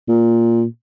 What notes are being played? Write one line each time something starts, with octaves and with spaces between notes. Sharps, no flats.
A#2